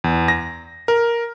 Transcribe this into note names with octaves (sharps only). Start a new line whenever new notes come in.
E2
A#6
A#4